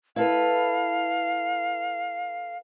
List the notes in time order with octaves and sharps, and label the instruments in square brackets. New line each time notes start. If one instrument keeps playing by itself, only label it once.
[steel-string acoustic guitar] E4 A4 B4 [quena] F5